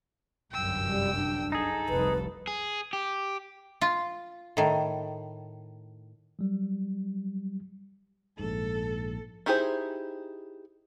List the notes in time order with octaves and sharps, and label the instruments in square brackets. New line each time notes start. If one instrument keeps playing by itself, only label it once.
[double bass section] G1 C2 F#2 [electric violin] G5 E6
[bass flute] G3
D4
[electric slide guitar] D#4 G#4 [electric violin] A4
[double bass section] F1 C2 [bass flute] B4
[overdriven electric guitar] G#4
G4
[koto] F4
A2 D#3
[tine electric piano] F#3 G3
[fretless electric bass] A#1 G#2 [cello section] A4
[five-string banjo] D#4 E4 G4 G#4 C5